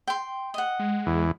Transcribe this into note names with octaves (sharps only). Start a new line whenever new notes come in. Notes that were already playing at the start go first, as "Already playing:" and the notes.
G5 C6
D#5 F#5
G#3
E2